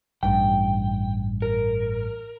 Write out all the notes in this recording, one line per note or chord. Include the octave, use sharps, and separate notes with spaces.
A1 G2 G5
A#4